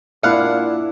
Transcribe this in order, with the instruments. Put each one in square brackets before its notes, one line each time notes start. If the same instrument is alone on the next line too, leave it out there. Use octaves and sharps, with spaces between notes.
[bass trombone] A#2 [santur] D4 E4 [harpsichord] F5 F#5